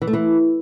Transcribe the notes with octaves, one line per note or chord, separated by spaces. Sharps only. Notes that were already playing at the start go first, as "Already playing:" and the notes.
E3
A3
E3